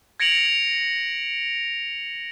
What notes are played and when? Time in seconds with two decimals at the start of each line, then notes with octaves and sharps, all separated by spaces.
0.20 G#6 A#6 C#7 D7 F7 F#7